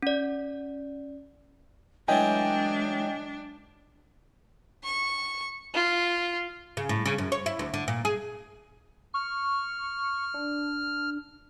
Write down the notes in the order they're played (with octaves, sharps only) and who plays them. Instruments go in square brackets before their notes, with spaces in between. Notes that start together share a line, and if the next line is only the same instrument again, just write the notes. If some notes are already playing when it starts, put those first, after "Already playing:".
[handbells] C#4 D5
[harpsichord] E3 F#3 A3 [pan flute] G#3 [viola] D4 [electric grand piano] D#5 G5 G#5
[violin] C#6
F4
[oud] C#3
A2
C#3
F#2
C#5
E4
D2
D3
A#2
G#4
[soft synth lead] C#6 [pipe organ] F6
[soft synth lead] D4